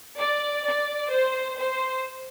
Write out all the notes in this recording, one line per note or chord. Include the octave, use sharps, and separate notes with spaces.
D5
D5
C5
C5